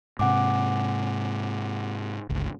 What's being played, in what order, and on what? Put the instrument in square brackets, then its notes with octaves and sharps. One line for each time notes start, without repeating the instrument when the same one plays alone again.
[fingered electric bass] G#2 C3 [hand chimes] F#5 G#5 D6
[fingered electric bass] G1 C#2